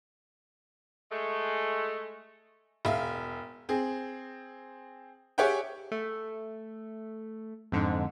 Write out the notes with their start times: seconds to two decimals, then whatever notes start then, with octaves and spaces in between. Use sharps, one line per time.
1.12 G#3 A3
2.85 E1 E5 F5
3.69 C4 G#4
5.38 G4 G#4 C#5 E5 F#5 G5
5.92 A3
7.72 F2 G#2 D3